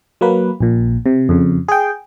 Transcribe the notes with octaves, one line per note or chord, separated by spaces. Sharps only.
F#3 A#3 B4
A#1 A#2
C3
F2 C#3
G#4 G5